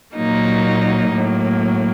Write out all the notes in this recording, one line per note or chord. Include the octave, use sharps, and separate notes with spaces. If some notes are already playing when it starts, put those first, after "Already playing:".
A#2 F#3 A#3 D#4
A2 F#3 A#3